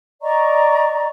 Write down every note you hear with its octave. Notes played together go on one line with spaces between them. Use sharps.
D5 D#5 A#5 C#6